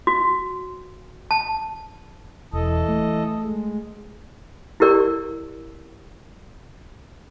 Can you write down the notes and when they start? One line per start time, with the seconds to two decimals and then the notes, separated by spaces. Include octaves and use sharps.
0.07 F#4
1.31 A5
2.53 E1 E3 A4 D#5
2.88 A3
3.43 G#3
4.80 E4 G4 A#4 D5